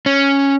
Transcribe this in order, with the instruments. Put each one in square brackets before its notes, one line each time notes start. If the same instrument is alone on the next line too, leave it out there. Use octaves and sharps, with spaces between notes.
[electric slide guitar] C#4